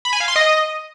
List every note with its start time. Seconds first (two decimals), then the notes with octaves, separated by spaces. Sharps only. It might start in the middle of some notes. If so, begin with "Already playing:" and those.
0.05 B5
0.13 G#5
0.20 F5
0.28 C6
0.36 D#5